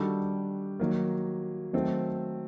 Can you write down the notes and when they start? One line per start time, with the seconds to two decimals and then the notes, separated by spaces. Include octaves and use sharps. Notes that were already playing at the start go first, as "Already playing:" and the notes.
Already playing: D#3 G3 D4 F#4 A4
0.80 D#3 F#3 A#3
1.73 D#3 F#3 A3 C4